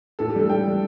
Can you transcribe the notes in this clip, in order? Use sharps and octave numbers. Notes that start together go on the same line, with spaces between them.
A2 A4
G4
G3 D4 A4
A2 G5
G3 D4